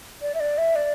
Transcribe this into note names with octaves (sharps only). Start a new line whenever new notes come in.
D5
E5
D5
E5
D5